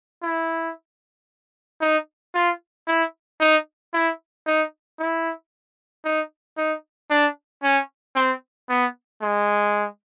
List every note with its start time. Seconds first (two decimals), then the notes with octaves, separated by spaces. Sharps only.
0.23 E4
1.81 D#4
2.34 F4
2.88 E4
3.40 D#4
3.93 E4
4.46 D#4
4.99 E4
6.05 D#4
6.57 D#4
7.10 D4
7.63 C#4
8.16 C4
8.69 B3
9.22 G#3